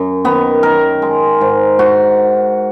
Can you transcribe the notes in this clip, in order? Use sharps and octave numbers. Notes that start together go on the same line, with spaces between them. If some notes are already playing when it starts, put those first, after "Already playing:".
Already playing: F#2
D#3 B3
D#3 A#4
G#3
G#2
G#2 F#4